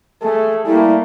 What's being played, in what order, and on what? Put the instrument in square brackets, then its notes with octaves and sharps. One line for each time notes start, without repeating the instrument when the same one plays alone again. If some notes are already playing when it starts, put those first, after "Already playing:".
[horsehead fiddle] A3 [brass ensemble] G#4 A4
[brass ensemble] G3 [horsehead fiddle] A3 A#3 [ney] E4